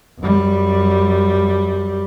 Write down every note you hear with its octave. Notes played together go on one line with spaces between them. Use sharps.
F#2 G3